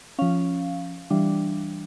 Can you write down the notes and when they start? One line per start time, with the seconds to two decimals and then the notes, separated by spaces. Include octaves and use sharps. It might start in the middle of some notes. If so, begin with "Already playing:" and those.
0.19 F3 C#4 F5
1.10 E3 G3 D4